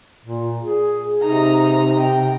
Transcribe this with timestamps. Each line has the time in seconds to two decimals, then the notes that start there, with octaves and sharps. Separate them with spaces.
0.25 A#2
0.61 G#4
1.22 C3 D#4 A#5
1.99 G5